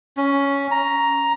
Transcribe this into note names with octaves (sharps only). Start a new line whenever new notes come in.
C#4
A#5